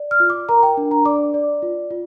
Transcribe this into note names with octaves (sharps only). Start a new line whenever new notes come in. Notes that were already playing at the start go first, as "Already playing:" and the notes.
Already playing: D5
F6
F4
D6
A#4 A#5
G5
D4
A#5
D5 D6
D5
F4
F4